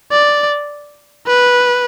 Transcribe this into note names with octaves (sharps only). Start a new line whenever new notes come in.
D5
B4